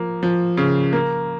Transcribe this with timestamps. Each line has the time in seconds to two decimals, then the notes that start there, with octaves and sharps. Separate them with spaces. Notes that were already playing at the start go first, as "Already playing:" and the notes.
Already playing: F3 A#3
0.23 F3
0.57 C#3
0.93 A#3